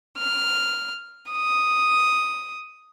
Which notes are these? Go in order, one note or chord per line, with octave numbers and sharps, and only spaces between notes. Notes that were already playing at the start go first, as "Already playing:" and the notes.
F6
D#6